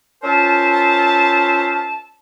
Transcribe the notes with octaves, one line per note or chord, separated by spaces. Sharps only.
C#4 F4 A#4 C5 E5 A5